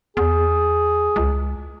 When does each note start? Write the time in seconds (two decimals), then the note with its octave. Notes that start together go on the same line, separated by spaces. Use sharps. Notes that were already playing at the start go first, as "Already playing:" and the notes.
0.17 E2 G#4
1.16 C#2